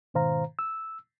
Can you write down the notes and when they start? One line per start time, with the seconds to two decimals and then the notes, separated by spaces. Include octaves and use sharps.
0.14 G#2 B2 D#3 C5 F5 A#5
0.59 E6